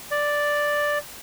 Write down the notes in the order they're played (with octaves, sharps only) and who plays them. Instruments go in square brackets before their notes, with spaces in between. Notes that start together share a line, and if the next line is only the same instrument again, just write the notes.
[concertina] D5